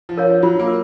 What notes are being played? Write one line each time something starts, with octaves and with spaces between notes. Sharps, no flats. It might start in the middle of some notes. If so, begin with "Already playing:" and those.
F3
A#4 C#5 F5
F3
F#3 F4
A#3
A#4